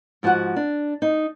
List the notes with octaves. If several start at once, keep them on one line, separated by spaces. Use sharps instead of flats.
G#2 F3 F#4 A#4 F#5
D4
D#4